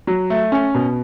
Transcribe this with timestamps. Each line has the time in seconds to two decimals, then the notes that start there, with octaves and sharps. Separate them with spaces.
0.07 F#3
0.30 A3
0.52 C#4
0.75 B2